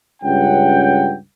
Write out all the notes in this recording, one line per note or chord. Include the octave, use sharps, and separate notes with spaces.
C#2 G2 C#4 F#5 G5